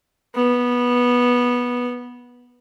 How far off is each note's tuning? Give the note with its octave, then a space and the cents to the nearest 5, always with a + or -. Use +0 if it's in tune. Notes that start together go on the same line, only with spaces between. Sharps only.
B3 -15